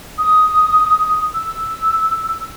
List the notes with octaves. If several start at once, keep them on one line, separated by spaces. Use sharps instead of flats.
D#6
E6